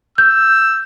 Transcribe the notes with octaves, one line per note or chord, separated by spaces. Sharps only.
E6 G6